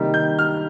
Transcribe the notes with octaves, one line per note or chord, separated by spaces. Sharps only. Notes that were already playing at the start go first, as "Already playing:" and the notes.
Already playing: C3 D#3 G3 A#3 D#4
G6
F6